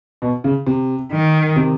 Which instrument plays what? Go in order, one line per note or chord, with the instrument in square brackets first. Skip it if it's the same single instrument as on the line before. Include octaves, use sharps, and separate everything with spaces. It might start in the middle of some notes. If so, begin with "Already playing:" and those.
[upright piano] B2
C#3
C3
[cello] D#3
[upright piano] C3